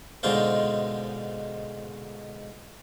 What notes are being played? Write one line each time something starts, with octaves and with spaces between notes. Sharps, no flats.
G#2 B2 D3 D#4 F4 C5